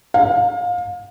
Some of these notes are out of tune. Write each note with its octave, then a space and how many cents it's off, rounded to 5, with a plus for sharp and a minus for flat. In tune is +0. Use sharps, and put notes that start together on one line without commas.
F5 +30